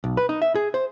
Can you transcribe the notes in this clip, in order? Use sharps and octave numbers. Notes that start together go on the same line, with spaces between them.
B1
B4
D#4
E5
G#4
C5